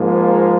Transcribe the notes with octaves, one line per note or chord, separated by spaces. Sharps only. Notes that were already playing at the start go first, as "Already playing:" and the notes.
Already playing: G#2 F3 A#3